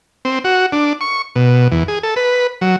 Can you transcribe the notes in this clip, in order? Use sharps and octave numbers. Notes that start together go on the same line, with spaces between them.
C4
F#4
D4
C#6
B2
E2
G#4
A4
B4
F#3